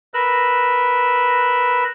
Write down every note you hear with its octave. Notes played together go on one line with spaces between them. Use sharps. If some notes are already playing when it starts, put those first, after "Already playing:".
A#4 B4 E6 F#6